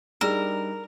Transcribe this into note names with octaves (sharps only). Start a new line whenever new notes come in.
G3 D4 D#4 G#4 A#4